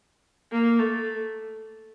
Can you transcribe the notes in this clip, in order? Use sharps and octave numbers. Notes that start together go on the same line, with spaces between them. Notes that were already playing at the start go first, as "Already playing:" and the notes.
A#3
A3